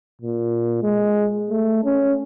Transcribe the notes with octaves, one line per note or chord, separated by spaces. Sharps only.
A#2
G#3
A3
C#4